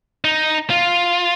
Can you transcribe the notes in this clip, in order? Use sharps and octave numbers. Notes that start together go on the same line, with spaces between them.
D#4
F4